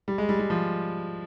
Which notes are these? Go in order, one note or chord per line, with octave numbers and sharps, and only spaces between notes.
G3
G#3
G3
G3
F3